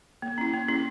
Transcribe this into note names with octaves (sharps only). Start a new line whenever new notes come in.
A#3
C#4 E4
A#3
C#4 E4